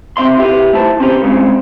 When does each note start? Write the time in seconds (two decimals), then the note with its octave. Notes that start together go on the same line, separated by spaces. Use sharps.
0.17 C3 C4 E5 C6
0.37 E4 G4 B4
0.73 A3 E4 C5 A5
1.00 C4 C#4 E4 G4 B4 C5
1.21 C2 C#3 G#3 C4 C#4